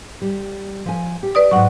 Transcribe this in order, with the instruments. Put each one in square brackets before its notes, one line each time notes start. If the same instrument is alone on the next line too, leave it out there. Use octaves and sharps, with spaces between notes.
[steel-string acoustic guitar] G3
F3 G#5
G4
[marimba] B4 D5 D#6
[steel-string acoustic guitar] G#2 F#3 [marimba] F#5 C#6